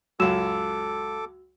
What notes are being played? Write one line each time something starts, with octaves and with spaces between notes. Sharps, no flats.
C#2 F#2 F#4 A4 D6 E6 E7